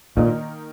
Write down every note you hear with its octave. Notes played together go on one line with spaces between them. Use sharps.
A#2 D#3 A#3 D#4 A#4